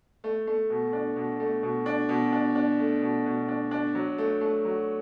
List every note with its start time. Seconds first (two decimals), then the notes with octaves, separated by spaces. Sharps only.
0.24 A3
0.47 A3
0.70 B2
0.93 D4
1.16 B2
1.40 A3
1.63 B2
1.86 D4
2.09 B2
2.33 D4
2.55 D4
2.79 A3
3.02 B2
3.26 B2
3.48 D4
3.71 D4
3.95 F#3
4.18 A3
4.41 A3
4.65 F#3